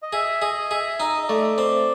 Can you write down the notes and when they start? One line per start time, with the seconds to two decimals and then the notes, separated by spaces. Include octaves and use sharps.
0.03 D#5
0.13 G#4 E5
0.41 G#4 D#5
0.71 G#4 E5
1.00 D#4 D#5
1.24 D#5
1.28 A3 D5
1.58 C4